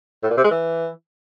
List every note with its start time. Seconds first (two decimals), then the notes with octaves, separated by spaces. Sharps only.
0.23 A2
0.30 A#2
0.37 C3
0.44 G#3
0.51 E3